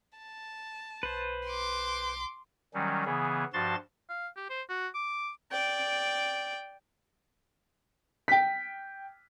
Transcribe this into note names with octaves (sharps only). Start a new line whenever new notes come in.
A5
B1 B4 C5
C6 D6
D#3 F#3 G3 C#4
C#3 E3 B3 G#4
G2 F3 F#4 A5 C6 A6
F5
G4
C5
F#4
D6
D5 G5
G5 B6